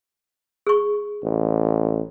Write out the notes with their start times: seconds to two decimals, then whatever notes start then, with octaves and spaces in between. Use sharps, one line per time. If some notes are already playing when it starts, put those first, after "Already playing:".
0.67 G#4 C#6
1.24 A1